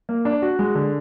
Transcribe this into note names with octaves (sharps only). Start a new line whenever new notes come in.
A#3
D4
F#4
G#3
D3